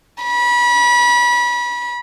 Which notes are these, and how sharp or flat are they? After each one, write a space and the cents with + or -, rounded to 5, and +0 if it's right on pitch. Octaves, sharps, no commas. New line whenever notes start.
B5 -30